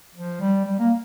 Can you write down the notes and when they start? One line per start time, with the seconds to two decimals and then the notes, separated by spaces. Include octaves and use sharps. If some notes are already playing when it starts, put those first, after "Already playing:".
0.15 F3
0.40 G3
0.65 G3
0.79 A#3